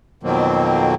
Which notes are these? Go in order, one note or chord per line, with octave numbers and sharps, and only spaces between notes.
F2 B2 D#3 F#3 A#3 C4